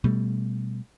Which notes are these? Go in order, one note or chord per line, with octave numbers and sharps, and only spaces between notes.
B2 G3 A3